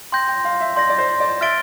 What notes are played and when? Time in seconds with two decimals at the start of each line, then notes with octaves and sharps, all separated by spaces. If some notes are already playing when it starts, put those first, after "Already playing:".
0.12 G5 C6 G6 A#6
0.28 G5
0.44 F5
0.61 E5
0.76 D5 C6 G6 A#6
0.89 D5
0.98 C5
1.20 D5
1.41 E5 F6 A6 D7 G7